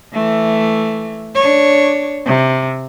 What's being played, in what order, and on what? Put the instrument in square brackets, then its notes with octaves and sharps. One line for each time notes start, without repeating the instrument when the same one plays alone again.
[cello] E3 A3
D4 C#5
C3